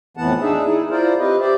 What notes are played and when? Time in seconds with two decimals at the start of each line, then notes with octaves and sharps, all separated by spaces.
0.17 F2 A2 E3 B3 F#5 A5
0.41 D4 D#4 G#4 E5
0.66 D#4 E4 G#4
0.91 E4 F4 A#4 C5 D5
1.19 C4 G4 B4 D#5
1.40 G4 C5 D5 E5